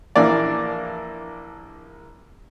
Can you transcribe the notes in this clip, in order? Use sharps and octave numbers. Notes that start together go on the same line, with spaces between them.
A#1 E3 A#3 D4 D5